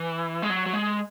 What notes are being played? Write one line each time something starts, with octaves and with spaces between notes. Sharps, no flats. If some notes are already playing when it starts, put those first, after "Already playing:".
Already playing: E3
G#3
F#3
F#3
G#3